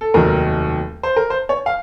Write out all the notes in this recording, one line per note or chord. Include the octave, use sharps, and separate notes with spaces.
A4
F1 D#2 D#3 F#3 A#4
C5
A#4
C5
C#5
F5